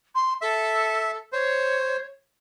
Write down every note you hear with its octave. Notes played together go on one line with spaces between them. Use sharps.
C6
A4 E5
C5 C#5